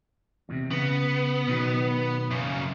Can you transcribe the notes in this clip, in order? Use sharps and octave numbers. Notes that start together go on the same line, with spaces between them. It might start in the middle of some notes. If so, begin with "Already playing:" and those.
E2 A2 C3
C#3 B3
B2 D#3 F#3
F#2 C#3